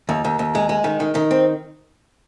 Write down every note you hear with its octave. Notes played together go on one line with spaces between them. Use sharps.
D#2
D#2
D#2
G#3
G#3
D#3
D#3
D#3
C4